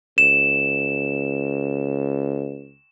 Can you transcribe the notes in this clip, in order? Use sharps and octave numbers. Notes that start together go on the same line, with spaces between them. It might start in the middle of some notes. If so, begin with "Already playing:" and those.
C#2 E7